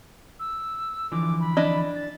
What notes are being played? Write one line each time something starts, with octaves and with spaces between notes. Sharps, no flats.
E6
D3 E3 F3 D6
B5
D4 E4 D#5
A6